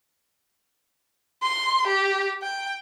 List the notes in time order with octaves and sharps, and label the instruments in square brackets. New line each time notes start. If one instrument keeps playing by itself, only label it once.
[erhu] C6
G4
G5